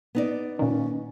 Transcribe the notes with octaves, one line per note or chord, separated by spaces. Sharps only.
B3 D#4 D5
A#2 D#3 C#4